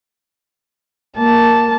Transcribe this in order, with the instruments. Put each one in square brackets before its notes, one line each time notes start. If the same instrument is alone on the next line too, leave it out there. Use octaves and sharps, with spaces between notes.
[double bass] A#3 [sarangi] A5